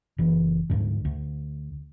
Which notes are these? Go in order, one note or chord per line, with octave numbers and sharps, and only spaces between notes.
F#1 E3
D2 G#2 D3
D2